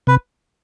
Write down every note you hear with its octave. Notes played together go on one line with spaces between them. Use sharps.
C3 B4